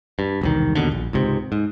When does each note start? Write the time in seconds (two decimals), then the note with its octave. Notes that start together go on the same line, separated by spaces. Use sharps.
0.19 G2
0.41 E1 C2 D#3
0.75 D#2 B2 D3
0.92 A#1
1.13 C#2 G#2 C3
1.52 G#2